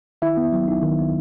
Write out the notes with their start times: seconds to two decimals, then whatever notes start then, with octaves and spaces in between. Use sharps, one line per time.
0.22 D#3 E4 E5
0.37 B3
0.53 F#3
0.68 D#4
0.83 D#3
0.98 B3